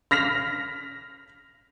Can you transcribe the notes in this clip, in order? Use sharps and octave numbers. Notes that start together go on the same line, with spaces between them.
F6 A#6 B6 F7